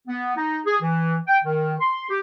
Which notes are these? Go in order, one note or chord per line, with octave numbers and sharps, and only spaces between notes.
B3
D#4
G#4
E3
G5
D#3
C6
G4